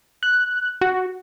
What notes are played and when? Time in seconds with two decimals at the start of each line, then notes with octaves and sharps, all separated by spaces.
0.23 F#6
0.81 F#4